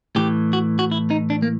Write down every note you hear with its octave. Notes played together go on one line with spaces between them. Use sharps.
A2 E3 G4
F#4
F#4
E4
D#4
D4
A#3